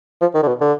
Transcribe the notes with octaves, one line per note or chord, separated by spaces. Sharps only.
F3
D#3
D3
B2
D3